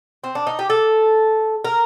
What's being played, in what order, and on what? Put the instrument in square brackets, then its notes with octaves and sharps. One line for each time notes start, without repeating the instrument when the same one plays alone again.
[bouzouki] C4
D4
D#4
G4
A4
A#4